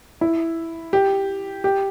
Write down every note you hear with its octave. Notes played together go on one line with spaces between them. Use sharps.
E4
G4
G4